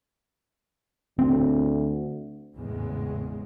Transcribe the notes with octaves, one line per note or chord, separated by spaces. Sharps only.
D2 C4
G#1 E2 A2 C#3 G#3